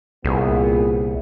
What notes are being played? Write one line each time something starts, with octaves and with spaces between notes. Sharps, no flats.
C2 A#2 B3 G#4